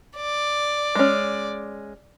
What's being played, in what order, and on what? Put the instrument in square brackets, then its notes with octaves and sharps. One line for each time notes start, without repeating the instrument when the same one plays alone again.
[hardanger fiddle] D5
[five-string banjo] G#3 C#4